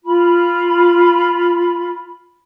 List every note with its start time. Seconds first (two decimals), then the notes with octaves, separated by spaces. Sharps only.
0.04 F4 B5